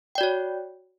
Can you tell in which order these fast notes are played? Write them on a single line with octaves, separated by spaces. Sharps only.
G5 D5 F#4 C#5